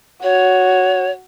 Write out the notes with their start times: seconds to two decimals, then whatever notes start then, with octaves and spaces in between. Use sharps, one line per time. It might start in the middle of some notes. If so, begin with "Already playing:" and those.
0.23 F#4 C#5